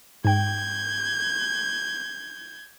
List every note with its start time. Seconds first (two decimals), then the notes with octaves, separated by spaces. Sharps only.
0.25 G#2 G5 G6 G#6